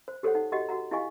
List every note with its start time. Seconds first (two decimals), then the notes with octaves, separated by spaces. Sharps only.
0.08 C5
0.23 G4 A4 C5 C#5 F#5
0.35 D#4 F#5
0.52 F#4 G4 D#5 F#5
0.69 F#4 F#5 A#5
0.91 E4 G4 D#5 F5 G#5 C#6